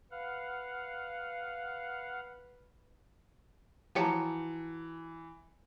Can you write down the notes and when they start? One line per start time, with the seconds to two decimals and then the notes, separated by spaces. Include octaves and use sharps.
0.11 B4 F5 F#5
3.95 E3 F3 F#4 G4 C#5 A5 A#5 C#7